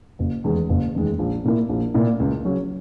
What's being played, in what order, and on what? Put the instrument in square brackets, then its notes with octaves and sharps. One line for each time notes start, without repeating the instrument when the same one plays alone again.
[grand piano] F#1
E2 D#3 G#3
F#1
E2 D#3 G#3
A#1
A#2 A#3 E4
A#1
A#2 A#3 E4
C#2
C#3 F#3 C#4